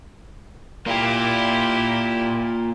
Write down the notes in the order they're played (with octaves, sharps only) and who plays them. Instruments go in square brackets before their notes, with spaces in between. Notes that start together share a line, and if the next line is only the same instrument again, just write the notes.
[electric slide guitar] A#3 F4 [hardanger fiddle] E4 G4